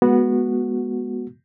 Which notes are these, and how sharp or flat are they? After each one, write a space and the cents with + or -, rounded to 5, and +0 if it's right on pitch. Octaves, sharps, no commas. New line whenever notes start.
G#3 +10 B3 -15 F#4 +0